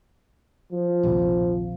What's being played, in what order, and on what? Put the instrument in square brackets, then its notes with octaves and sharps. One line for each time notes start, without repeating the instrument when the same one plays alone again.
[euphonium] F3
[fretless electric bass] A#1 D#2 C3